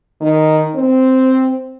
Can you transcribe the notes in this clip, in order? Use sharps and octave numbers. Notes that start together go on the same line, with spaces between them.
D#3
C4